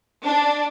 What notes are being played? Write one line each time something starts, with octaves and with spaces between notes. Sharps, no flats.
D4